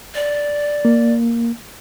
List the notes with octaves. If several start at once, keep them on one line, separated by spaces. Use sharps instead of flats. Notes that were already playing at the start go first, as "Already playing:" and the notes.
D5
A#3